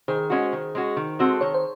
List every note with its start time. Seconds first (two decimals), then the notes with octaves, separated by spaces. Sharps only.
0.08 D#3 G#4 C5
0.30 G#3 C#4 F#4
0.53 D#3
0.75 G#3 C#4 F#4
0.97 D#3
1.19 G#3 C4 F#4 A4
1.41 D#3 C#5
1.54 C5